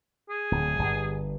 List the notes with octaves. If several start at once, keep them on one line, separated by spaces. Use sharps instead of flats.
G#4
D1
G1 G2